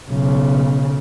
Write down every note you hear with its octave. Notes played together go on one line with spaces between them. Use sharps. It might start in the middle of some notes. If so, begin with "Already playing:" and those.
B1 C#3